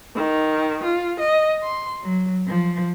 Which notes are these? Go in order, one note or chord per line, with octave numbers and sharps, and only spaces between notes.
D#3
F4
D#5
C6
F#3
F3